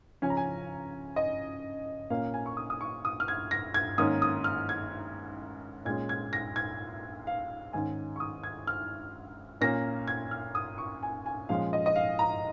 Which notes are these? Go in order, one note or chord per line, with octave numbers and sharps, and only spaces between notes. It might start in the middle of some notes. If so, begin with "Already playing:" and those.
C#3 F3 C#4 G#5
A#5
G#5
D#5
A#2 A#3 C#4 F5
G#5
C#6
D#6
D#6
C#6
D#6
F6
G#6
A#6
G#6
G#2 D#3 A#3 C#4 D#6
D#6
F6
G#6
A#2 G#3 C#4 G#6
G#6
A#6
G#6
F5
G#2 D#3 C#4 G#5
C#6
D#6
G#6
F6
A#2 A#3 C#4 A#6
G#6
F6
D#6
C#6
G#5
G#5
A#2 F3 G#3 C#4 F5
D#5
D#5
F5
A#5